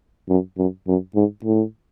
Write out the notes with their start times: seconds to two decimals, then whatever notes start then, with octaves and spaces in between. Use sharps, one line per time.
0.29 F#2
0.57 F#2
0.87 F#2
1.15 G#2
1.45 A2